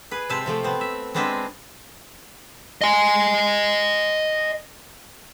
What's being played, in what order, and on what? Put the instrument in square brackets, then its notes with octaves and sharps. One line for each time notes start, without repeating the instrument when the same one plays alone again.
[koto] G#4 B4
C3 G#3 C5 E5 A5
C3 F3 A3 G5
B3 C4
E5
G#3 B3 C4 D4 D#5 E5
[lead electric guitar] D#5 G#5